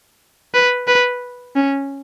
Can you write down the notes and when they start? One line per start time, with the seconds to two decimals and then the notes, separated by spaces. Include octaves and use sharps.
0.54 B4
0.88 B4
1.56 C#4